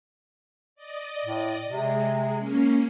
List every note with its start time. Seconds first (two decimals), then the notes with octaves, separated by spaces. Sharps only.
0.75 D5 D#5
1.25 A2
1.69 C3 G#3
2.37 A#3 C#4